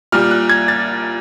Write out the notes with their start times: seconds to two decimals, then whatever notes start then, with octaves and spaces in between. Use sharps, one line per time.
0.12 A#2 G3 F6
0.31 F#6
0.49 G#6
0.68 A6